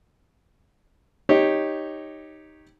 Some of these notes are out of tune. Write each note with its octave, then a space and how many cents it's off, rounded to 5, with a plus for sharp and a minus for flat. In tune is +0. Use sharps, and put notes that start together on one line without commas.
D#4 +0 G4 +0 C#5 -10